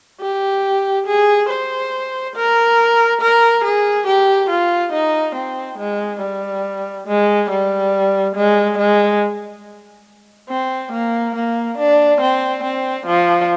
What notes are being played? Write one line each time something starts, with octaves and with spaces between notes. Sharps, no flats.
G4
G#4
C5
A#4
A#4
G#4
G4
F4
D#4
C4
G#3
G3
G#3
G3
G#3
G#3
C4
A#3
A#3
D4
C4
C4
F3